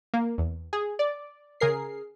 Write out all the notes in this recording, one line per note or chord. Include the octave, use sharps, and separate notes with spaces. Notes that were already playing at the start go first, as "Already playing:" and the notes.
A#3
E2
G#4
D5
C#3 G#4 A#4 C7